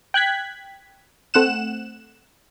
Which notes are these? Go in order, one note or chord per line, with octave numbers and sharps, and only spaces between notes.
G5 F#6 G#6 B6
A3 C4 F#5 F#6 E7